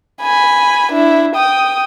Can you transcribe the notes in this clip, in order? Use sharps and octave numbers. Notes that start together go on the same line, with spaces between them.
G#5 B5
D4 E4
G5 D#6